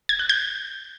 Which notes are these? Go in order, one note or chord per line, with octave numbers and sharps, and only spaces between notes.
G#6
F#6
G6